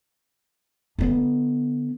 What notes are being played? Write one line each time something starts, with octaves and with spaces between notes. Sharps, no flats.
D3 B3